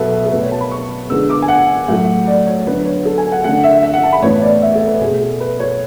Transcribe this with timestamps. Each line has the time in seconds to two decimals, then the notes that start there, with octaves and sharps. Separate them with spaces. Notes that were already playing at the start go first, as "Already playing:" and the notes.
Already playing: B2 F#3 B3 A4 B4 E5
0.26 A4
0.32 B2 A3 B4
0.42 C#5
0.52 A5
0.61 B5
0.71 C#6
1.10 D3 G#3 B3 E6
1.30 D6
1.42 G#5
1.48 F#5
1.88 A2 F#3 A3
2.27 D5
2.47 C#5
2.66 D3 F#3 B3 B4
2.78 B4
2.85 C#5
3.05 A4
3.18 G#5
3.32 F#5
3.44 D3 A3 F#5
3.64 E5
3.83 E5
3.93 F#5
4.03 A5
4.13 B5
4.22 A2 E3 B3 C#5
4.42 D5
4.62 E5
4.75 A4
4.88 B4
5.01 B2 A3 G#4
5.21 A4
5.40 B4
5.60 C#5